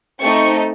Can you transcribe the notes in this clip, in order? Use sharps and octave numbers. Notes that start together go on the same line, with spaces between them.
A3 C4 D#4 C#6